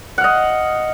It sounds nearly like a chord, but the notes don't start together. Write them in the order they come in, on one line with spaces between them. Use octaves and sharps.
F#5 F5 D#5